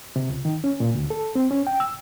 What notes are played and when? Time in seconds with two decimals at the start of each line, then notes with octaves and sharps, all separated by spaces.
0.16 C3
0.30 C#2
0.45 D#3
0.64 C#4
0.80 A#2
0.95 D2
1.10 A4
1.35 C4
1.51 C#4
1.67 G5
1.80 E6